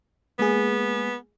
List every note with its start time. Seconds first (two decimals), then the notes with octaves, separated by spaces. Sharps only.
0.39 G#3 A#3 B3 G#4